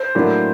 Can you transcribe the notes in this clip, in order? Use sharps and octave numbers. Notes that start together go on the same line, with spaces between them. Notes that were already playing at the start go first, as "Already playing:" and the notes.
Already playing: C5
A2 F#3 A#3 D4